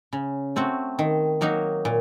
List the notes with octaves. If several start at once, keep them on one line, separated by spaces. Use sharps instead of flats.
C#3
A3 C4 F#4
D#3
F#3 A#3 D#4 F#4
A#2